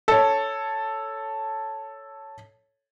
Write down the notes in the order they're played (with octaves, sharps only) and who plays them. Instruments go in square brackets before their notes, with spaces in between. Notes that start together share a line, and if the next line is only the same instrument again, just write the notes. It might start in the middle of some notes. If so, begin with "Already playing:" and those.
[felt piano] A4 C#5